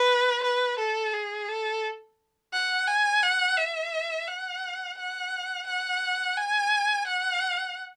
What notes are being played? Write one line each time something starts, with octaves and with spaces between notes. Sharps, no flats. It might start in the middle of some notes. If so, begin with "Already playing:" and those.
Already playing: B4
B4
A4
G#4
A4
F#5
G#5
F#5
E5
F#5
F#5
F#5
G#5
F#5